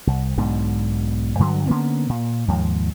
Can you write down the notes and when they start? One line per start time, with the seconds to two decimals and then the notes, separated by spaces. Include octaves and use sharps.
0.07 C2
0.37 B1 G#2 B2 D3
1.39 G2 D3 D#3 F#3
1.66 D3 A#3 B3 C#4
2.09 A#2
2.48 D#2 G#2 F3